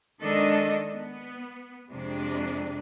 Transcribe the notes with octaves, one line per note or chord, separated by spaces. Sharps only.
D#3 G#3 D4 A4 D#5
B3
F2 C3 G#3 D4